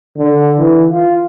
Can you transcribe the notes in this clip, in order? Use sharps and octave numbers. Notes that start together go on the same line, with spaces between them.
D3
E3
F4